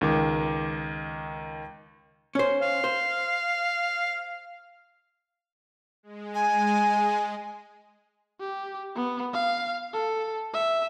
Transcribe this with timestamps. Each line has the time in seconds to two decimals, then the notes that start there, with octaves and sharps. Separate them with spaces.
0.01 C#2 D#3 D6
2.35 C#4 C5
2.62 F5
2.84 C5
6.03 G#3
6.35 G#5
8.40 G4
8.96 B3
9.33 F5
9.93 A4
10.54 E5